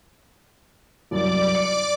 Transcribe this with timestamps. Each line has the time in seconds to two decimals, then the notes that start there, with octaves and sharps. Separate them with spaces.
1.11 C2 F#2 D5 D6
1.55 C#7